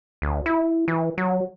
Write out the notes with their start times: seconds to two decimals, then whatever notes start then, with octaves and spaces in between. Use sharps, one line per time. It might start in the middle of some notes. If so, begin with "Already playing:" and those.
0.22 D2
0.46 E4
0.88 E3
1.18 F#3